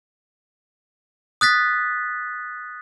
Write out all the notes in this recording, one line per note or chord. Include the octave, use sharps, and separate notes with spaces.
D#6 F#6 A6 B6